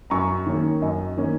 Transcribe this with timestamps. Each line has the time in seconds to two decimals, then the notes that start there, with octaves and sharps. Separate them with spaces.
0.10 F#2 A#5 C#6
0.46 D#3 A#3 C#4
0.82 F#2 D#5
1.17 D#3 A#3 C#4